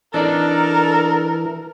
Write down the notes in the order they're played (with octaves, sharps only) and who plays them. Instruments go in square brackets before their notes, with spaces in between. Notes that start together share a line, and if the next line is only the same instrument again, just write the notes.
[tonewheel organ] E3 [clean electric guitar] D4 D#4 D5 [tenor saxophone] A4 [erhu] A#4